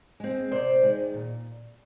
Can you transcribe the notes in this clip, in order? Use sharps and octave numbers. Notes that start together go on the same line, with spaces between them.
G#3 C4
C3 C5 D5
D#3 G#3
A#2